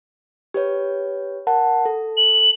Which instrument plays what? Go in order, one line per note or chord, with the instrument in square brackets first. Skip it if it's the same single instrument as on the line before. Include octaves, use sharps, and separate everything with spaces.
[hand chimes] G4 B4 C#5
A#4 F#5 A5
A4
[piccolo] F#7